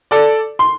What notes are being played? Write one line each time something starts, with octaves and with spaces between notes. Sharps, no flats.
A4 D5
C6